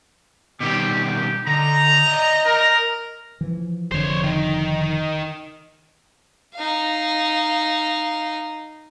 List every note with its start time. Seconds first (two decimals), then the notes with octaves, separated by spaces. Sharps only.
0.60 B2 D#3 G3 C4 G4
1.03 G4
1.47 D3 D#4 A#5
2.07 D5 D#5
2.46 A#4
3.41 E3 F3
3.92 F1 D3 F3 C5 C#5
4.24 D#3
6.55 D#4 F5